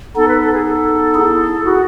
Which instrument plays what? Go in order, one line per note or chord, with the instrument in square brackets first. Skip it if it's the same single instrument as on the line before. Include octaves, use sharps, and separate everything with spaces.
[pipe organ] B3 D#4 [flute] A4
[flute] B4
A4
G#4
A4
[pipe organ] E4 G#4
[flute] F#4